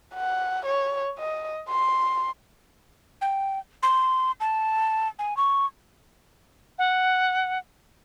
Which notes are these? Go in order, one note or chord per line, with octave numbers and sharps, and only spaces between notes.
F#5
C#5
D#5
C6
G5
C6
A5
G#5
C#6
F#5